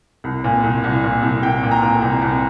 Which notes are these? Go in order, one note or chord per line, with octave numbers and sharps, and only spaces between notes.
C2
A#2
C2
C2
A#2
C2
C2 G5
A#2
A#5
A#2
C2
C2